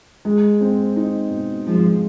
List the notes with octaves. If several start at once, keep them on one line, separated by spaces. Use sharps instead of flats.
G#3
C4
D#4
B2
F3 G#3